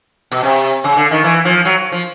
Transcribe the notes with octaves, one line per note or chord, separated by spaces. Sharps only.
B2
C3
C#3
D3
D#3
E3
F3
F#3
F3